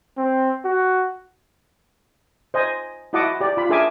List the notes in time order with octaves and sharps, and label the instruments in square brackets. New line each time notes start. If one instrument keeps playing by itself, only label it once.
[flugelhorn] C4
F#4
[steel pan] C5 D#5 G#5
E4 F#4 D#5 F#5 A5 D6
G4 D5
F4 B5
D4 G#4 A#4 E5 G#5 D6